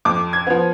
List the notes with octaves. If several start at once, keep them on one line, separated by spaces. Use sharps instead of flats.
F2 D6
G#6
F3 B3